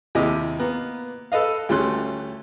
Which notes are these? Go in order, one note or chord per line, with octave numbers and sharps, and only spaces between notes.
D#2 C3 E4 G4 D#5
A#3 B3
A4 B4 D#5 F5
D2 G3 A3 C#4 C6 F#6